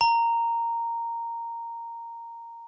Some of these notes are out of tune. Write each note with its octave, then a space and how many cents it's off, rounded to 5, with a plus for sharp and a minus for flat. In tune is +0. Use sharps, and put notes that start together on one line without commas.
A#5 -10